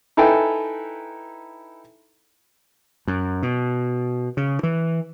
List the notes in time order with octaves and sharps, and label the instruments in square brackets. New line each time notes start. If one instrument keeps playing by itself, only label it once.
[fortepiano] D#4 E4 A4 B4 G5 G#5
[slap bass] F#2
B2
C#3
E3